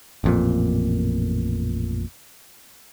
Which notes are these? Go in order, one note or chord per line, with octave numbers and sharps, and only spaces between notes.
A1 F2 A#2